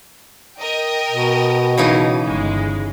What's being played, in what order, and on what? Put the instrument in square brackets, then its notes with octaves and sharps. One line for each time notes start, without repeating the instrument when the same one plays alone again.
[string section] A#4 D#5 G5
[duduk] B2
[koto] C#3 E3 D#4
[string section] G1 G#3